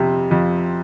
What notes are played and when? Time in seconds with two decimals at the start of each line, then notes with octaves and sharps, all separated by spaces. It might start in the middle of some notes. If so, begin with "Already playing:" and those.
Already playing: F2 C3
0.31 F2